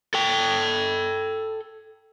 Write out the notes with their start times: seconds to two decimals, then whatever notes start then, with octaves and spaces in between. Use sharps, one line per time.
0.14 A4 G5